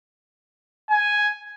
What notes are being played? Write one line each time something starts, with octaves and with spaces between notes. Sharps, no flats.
G#5